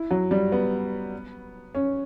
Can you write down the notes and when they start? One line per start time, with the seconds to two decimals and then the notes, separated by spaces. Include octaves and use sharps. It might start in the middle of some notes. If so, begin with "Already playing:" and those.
Already playing: E4
0.11 F#3
0.31 G3
0.52 B3
1.75 C#4